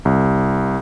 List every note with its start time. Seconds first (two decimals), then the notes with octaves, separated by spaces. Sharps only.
0.05 C2